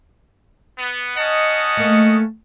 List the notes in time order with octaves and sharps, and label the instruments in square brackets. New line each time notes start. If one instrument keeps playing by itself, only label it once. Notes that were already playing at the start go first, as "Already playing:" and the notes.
[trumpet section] B3
[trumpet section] C#4 F#5 A5 [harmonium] D#5
[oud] A3 A#3